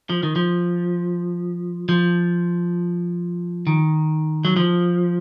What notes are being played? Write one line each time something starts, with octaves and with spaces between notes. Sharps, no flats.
F3
D#3
F3
F3
D#3
F#3
F3